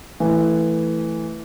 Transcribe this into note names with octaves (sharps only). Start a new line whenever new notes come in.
E3 A3